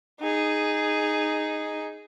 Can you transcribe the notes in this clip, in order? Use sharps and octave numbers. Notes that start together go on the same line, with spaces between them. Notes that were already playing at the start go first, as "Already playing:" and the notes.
D#4 G#4